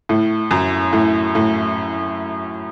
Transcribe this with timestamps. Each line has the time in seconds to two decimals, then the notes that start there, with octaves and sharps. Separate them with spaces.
0.09 A2
0.51 F#2
0.93 A2
1.35 A2